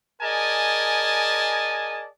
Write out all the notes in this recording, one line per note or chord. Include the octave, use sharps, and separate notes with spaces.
G#4 A#4 D5 D#5 G#5 A5